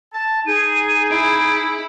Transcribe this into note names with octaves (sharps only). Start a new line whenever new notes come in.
A5
D#4 G#4 D#7
E4 D7